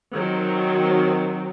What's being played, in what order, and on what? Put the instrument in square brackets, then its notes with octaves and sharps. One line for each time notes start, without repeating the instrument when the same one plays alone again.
[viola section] D#3 F#3 C4